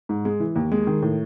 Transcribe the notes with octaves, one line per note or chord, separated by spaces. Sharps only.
G#2
G#3
E3
D#2
G#3
D#3
A2